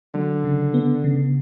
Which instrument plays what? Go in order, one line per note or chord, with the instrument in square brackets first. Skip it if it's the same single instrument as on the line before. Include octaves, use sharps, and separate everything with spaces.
[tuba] D3 [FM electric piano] F#3
[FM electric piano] C#3
B3
C#3